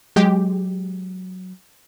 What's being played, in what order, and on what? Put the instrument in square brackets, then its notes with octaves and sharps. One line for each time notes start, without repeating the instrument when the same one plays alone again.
[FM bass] F#3 [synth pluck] G#3 G4